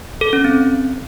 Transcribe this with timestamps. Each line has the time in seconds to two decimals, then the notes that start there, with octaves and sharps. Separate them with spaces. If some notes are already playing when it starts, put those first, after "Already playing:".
0.21 A4
0.33 C#4
0.45 C4